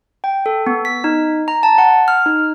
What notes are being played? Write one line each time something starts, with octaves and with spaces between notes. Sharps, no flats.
G5
A4
B3
B6
D#4
A#5
A5
F#5
F6
D#4